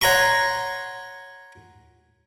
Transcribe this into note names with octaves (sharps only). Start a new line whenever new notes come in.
C#5 F#5 A#5 C6 C#6